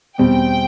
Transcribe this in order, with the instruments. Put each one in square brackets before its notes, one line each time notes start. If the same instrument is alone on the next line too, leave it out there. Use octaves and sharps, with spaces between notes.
[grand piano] E2 B2 G3 C4 [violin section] G5